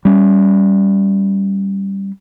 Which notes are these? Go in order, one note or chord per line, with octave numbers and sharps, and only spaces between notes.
G3 C#4